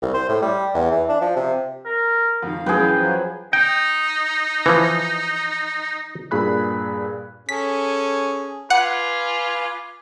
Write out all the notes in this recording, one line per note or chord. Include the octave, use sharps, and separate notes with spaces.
C2
C5
A2
G3
E2
E3
D4
F3
C3
A#4
F2 D#3 F5
F#2 E3 G#4 B4 G5
F3 F#3
D#4 G5
E3 F3
G2 A#2 G#4 B5 F#6
C#4 G#4 A4 B6
F4 B4 F#5 G#5 D6